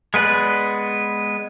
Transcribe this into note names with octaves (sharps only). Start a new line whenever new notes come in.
G#3 B3 B4 D5 F#6